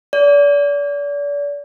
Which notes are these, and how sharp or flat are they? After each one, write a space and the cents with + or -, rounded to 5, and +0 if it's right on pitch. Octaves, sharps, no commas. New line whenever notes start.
D5 -35